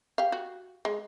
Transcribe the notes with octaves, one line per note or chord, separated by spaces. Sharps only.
G4 F5
F#4
G#3